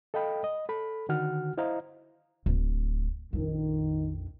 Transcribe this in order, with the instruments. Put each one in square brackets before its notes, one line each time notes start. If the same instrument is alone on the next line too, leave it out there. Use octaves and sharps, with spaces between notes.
[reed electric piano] A4 D#5 F5 G5 B5
D#5
A4 B5
D3 D#3 F#4 F#5 F6
E4 C5 D#5 F5 A#5
[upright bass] D1
[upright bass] A#1 F2 [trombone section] D#3